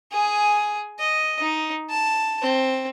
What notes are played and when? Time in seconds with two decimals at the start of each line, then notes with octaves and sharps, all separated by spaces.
0.12 G#4 G#5
0.99 D#5
1.40 D#4
1.90 A5
2.43 C4